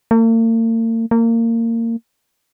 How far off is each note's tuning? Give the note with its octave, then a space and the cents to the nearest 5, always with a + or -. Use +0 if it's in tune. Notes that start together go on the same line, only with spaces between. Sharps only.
A#3 -45
A#3 -25